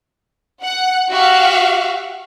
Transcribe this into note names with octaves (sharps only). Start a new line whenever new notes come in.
F#5
F#4 G4 E5 F5